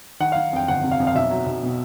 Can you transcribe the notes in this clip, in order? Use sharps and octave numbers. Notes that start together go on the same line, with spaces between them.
D#3 F#5
D#3 F5
F2 G5
G1 F#5
C3
F5
F2
F5
B1 E5
F#3
B1
B2